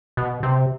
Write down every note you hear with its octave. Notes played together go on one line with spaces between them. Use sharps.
B2
C3